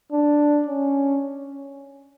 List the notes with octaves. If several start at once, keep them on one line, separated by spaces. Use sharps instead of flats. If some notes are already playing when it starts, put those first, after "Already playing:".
D4
C#4